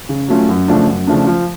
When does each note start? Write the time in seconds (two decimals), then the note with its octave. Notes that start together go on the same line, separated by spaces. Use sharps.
0.09 C#3
0.28 F#3 A3 C#4 F4
0.49 F#2
0.68 C#3 F3 A3 D4
0.87 F#2
1.07 C#3 F3 A3 D4
1.27 F3